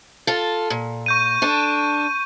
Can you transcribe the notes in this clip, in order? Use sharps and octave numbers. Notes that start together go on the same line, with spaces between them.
F4 A4
A#2
C#6 G6 D#7
D4 A4